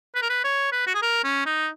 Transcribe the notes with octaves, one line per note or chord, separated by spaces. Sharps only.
B4
A#4
B4
C#5
B4
F#4
G#4
A#4
C#4
D#4